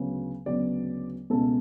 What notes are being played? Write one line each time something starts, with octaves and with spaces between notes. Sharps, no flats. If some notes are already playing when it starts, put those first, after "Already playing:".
Already playing: D2 C#3 F#3 B3
D2 C#3 F#3 B3 D5
C#2 B2 A3 A4